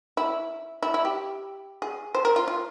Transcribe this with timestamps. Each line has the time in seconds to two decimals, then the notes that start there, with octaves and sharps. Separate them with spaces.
0.17 E4
0.82 E4
0.94 E4
1.05 G4
1.82 G#4
2.15 C5
2.25 A#4
2.36 F4
2.48 F4